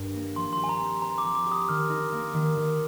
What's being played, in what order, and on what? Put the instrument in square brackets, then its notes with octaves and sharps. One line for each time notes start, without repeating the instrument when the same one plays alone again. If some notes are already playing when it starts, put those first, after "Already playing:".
Already playing: [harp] G2 D#3 D4
A#3
[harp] F3 [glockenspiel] C6
[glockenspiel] C6
[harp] G4
[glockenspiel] G#5
A#5
[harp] C4
[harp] C5 [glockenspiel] A#5
[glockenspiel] D6
[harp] F3
[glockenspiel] D6
[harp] G4
[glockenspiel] D#6
[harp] D#3 [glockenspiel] F6
[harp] D#4
A#3
D#3
D#3